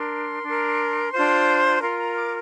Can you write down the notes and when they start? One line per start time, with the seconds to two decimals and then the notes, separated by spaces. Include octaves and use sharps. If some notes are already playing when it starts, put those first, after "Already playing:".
Already playing: D4 A#4 C6
0.43 D4 A#4
1.12 D4 F4 C5
1.81 F4 A#4 C6
1.98 A#5
2.16 D6